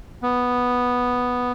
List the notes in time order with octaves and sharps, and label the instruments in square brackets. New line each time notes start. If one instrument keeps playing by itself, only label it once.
[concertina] B3